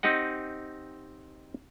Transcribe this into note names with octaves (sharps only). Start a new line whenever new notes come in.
C4 D#4 G4 D#5 F#5